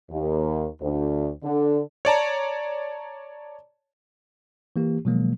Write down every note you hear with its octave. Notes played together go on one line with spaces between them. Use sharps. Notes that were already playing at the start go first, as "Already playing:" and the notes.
D#2
D2
D3
C#5 D5 A5 A#5
E3 A#3 G4
B2 D#3 F3 F#3 G#3 A#3